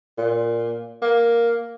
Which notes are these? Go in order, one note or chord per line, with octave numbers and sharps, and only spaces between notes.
A#2
A#3